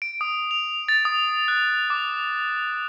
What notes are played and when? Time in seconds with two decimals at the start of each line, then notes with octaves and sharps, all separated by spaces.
0.02 D7
0.21 D#6
0.51 F7
0.89 A6
1.05 D#6
1.48 F#6
1.90 D6